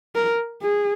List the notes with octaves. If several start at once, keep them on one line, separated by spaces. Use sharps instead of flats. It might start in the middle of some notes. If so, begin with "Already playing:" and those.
A#4
G#4